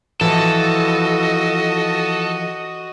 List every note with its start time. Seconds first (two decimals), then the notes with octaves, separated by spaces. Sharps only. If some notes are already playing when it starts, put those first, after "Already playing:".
0.21 E3 F3 F#4 A4 D#5